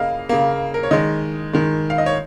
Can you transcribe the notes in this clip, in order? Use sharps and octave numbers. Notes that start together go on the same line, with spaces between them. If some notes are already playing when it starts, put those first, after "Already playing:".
Already playing: C#3 A#3 D#5 F5
C#3 A#3
A#4
C#5
D#3 G#3 D#5
D#3 G#3
F5
D#5
C#5